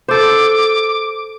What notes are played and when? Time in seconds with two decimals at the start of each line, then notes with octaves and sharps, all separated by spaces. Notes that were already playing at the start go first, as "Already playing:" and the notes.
0.08 A4 C5 D6